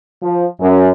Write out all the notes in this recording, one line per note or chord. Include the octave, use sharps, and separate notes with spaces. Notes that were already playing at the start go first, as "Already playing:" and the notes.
F3
F#2